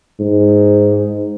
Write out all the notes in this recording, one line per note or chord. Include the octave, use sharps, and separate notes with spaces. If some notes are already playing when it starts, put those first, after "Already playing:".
G#2